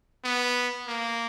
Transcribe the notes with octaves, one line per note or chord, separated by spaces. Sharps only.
B3
A#3